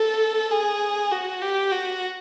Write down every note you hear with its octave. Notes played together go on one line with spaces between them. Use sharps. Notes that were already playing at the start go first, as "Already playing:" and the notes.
Already playing: A4
G#4
F#4
G4
F#4